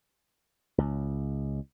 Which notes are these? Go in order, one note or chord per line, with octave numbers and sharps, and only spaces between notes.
C#2